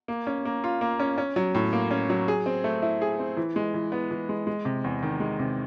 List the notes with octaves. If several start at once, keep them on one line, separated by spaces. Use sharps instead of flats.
A#3
C#4
A#3
F4
A#3
C#4
C#4
F#3
A2
A#3
C#4
F#3
G#4
C4
A3
E4
G#4
C4
E3
G#3
E3
B3
E3
G#3
G#3
C3
E2
D#3
G#3
C3